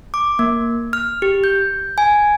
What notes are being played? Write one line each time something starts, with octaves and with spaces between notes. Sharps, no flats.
D6
A#3
F6
G4
G6
G#5